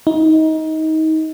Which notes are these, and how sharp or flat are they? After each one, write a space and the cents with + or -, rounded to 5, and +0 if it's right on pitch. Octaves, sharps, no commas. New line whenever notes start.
D#4 +25